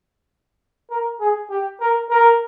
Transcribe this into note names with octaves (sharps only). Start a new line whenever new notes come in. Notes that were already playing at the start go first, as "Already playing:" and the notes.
A#4
G#4
G4
A#4
A#4